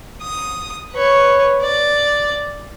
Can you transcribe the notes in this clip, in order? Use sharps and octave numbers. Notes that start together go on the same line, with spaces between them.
D#6
B4 C#5
D5